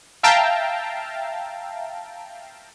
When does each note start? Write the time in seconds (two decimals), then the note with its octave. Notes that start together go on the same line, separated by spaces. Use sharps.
0.23 E5 F5 G5 A5 A#5